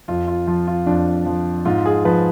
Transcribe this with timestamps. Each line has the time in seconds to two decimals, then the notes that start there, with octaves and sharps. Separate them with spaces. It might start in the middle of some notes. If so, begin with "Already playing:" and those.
0.08 F2 F4
0.28 F4
0.47 F3 F4
0.67 F4
0.86 F2 D4
1.26 F3
1.65 G#2 F4
1.86 G#4
2.05 F3 B4